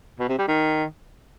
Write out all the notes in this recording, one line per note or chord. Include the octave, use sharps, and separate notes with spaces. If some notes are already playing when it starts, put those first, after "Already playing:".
B2
C3
G3
D#3